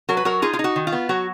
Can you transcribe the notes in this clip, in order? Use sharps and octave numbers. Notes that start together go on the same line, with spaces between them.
F#3 F#4 A#4
B4
F#3 F#4 A#4
D#4 F4 G#4
F4
D#4
F#4
D#3
F4
B3
F#3 F#4